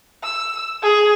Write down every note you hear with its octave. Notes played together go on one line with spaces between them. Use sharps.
E6
G#4